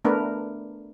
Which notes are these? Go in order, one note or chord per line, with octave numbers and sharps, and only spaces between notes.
A3 B3 D4 A#4 B4